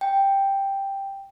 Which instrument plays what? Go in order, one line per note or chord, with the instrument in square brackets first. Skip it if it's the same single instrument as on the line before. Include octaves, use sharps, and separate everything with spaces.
[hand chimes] G5